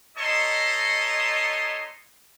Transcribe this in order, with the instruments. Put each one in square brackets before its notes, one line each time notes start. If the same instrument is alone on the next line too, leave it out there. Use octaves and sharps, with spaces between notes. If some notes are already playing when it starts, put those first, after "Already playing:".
[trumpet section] A3 D#4 A4 C#5 D#5 C6